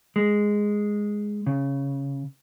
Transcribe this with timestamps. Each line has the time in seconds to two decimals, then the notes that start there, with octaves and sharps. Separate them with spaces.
0.16 G#3
1.47 C#3